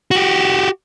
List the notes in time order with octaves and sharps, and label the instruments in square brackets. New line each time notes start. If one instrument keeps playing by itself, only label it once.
[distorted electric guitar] F#4 G4